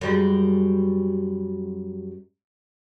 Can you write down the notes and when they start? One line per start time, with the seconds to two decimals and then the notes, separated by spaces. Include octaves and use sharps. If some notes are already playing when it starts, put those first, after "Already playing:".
0.01 F#2 G3 G#3